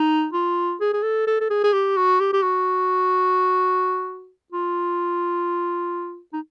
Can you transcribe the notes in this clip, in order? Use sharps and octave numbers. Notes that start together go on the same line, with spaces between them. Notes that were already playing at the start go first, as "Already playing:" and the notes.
Already playing: D#4
F4
G#4
G#4
A4
A4
A4
G#4
G#4
G4
F#4
G4
G4
F#4
F4
D#4